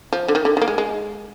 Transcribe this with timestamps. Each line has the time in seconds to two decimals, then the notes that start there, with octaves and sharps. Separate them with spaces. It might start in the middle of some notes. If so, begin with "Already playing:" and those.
0.13 F3
0.28 D3
0.35 D#3
0.45 D3
0.57 D#3 A#3
0.68 G#3
0.78 G#3